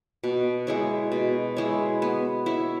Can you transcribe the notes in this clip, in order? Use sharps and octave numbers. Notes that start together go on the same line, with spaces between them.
B2
G#3 E4 C#5
B2
G#3 E4 C#5
B3
E4 C#5